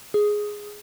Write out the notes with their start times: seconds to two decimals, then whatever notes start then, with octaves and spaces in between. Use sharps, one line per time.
0.14 G#4